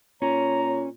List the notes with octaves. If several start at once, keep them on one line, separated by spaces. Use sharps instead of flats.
A#2 C#4 C#5 A#5